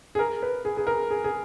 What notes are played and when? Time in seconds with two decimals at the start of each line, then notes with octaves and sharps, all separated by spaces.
0.15 G#4
0.19 A#4
0.42 B4
0.65 G#4
0.77 G#4
0.87 A#4
1.11 G#4
1.24 G#4